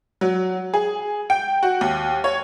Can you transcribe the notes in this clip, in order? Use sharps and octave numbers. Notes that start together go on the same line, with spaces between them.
F#3
G#4
G5
F#4
D#2
C#5